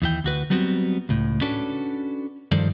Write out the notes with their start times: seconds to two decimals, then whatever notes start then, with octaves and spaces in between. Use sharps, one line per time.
0.02 D#2 E3 G5
0.24 D2 F#4 B4
0.50 F#3 G3 B3 C4 F#4
1.09 C#2 A2
1.41 C#4 D4 F#4 A4 B4 D5
2.52 G2 D#3 F3 A4 C5 D5